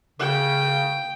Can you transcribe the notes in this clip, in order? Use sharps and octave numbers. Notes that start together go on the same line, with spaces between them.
C#3 G5